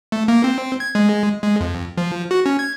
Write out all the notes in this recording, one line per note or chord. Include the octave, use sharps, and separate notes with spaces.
A3
A#3
C4
G#6
G#3
G#3
F2
F3
F#4
C#4
G#6